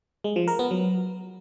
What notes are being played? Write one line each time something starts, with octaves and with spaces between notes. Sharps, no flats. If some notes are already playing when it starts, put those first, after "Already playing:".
G#3
F3
A#4
B3
F#3